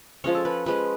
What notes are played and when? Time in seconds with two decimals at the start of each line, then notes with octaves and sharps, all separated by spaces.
0.24 F3 G#3 C#4 C#5
0.35 A4
0.45 B4
0.66 F3 G#3 C#4 B4